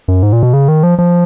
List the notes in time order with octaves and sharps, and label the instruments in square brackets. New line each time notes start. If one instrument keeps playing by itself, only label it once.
[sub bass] F#2
G#2
A#2
B2
C#3
D#3
F3
F3